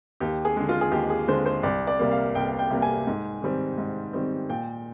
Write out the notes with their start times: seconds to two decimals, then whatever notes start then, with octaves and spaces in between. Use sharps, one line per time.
0.20 D#2 G4
0.45 G#4
0.57 D3 G#3
0.69 F4
0.81 G#4
0.92 D#2 G4
1.10 G#4
1.28 D3 G#3 C5
1.46 C5
1.63 C2 D5
1.87 D5
1.99 C3 G3 A#3
2.11 F5
2.35 C2 G5
2.59 G5
2.70 C3 G3 A#3
2.82 G#5
3.07 G#2
3.42 D#3 G3 C4
3.78 G#2
4.13 D#3 G3 C4
4.49 A#2 G5